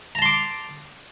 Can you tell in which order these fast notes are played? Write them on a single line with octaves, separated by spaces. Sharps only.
A#5 A5 C6 D6